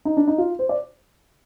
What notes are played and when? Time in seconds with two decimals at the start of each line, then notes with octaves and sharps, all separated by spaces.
0.05 D#4
0.17 D4
0.28 D#4
0.38 F4
0.59 C5
0.69 D5